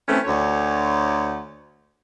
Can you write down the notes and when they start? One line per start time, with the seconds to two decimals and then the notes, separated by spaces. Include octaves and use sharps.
0.08 E3 A3 C4 C#4
0.25 D2 C#5